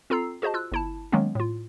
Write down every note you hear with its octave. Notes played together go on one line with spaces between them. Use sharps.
C4 F4 A4 A#5 E6 C7
F#4 G#4 C5 D#5 A5
F4 E6 F#6
G1 E4 A5
D#3 F#3 G#3 A#3 B3 C#4
A2 F4